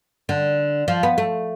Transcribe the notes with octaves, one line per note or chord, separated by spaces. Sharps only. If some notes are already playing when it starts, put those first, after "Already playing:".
D3
F3
B3
A3